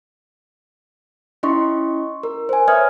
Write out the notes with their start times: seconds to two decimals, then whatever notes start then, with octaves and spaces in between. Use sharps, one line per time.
1.43 C#4 E4 D#5 C6 C#6
2.23 A#4
2.49 C5 G#5
2.68 B4 C#5 E5 D#6 F6 G#6